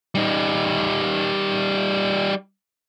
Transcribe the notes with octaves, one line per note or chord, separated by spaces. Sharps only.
G3 D#4